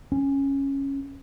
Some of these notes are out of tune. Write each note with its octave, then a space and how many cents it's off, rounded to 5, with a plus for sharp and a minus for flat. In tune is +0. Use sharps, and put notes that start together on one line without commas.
C#4 -10